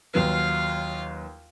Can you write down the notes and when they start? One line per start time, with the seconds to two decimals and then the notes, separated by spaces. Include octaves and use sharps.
0.14 D#2 F#3 F4 B4 F5